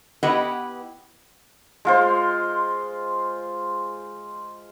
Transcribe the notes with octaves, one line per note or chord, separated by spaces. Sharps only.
B3 E4 G4 B4 D#5 F#5
G#3 F4 C5